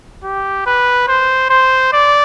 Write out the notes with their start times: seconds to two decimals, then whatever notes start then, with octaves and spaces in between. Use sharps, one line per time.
0.24 G4
0.66 B4
1.08 C5
1.50 C5
1.93 D5